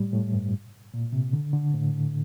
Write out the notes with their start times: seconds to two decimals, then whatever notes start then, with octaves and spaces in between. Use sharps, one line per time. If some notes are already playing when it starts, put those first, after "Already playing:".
Already playing: A2 G3
0.13 A2
0.34 G2
0.94 A#2
1.13 C3
1.33 D3
1.53 D3
1.74 A2